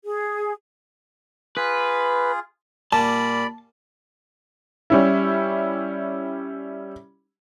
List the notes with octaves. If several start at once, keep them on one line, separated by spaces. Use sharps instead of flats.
G#4
F4 G#4 B4
A#2 G3 D5 A5 B5
G3 C#4 E4